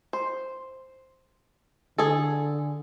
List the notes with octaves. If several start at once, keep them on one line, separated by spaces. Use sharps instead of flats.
C5
D3 G#4 A4